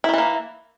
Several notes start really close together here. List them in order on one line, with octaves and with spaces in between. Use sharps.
E4 D#3 E3 A#3